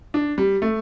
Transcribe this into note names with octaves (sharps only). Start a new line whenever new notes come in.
D4
G3
A3